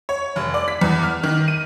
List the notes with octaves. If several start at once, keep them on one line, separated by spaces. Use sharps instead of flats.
C#5
F1
D5
B6
E2
F6
D#3
D#7